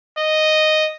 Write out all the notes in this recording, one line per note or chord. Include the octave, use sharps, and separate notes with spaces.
D#5